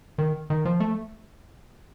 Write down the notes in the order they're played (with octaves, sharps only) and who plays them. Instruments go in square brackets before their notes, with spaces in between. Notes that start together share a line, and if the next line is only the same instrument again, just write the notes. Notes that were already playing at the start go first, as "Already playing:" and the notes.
[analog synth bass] D#3
D#3
F3
A3